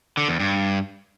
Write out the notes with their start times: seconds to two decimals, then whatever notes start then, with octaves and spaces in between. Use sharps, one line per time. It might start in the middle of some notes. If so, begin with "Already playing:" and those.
0.17 D3
0.28 E2
0.40 G2